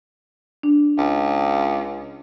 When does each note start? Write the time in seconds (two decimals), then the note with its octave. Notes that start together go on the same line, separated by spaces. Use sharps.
0.63 D4
0.98 C#2